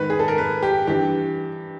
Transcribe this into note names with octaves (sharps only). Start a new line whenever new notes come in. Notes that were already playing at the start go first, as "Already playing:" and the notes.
Already playing: G#2 D#3 B4
G#4
A4
A#4
B4
G4
G2 E3 G4